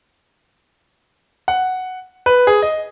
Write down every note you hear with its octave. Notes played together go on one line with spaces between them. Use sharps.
F#5
B4
G#4
D#5